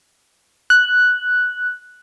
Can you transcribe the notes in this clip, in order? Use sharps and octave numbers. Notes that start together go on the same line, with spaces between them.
F#6